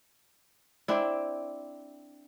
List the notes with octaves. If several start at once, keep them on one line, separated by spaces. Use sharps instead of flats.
C4 D4 E4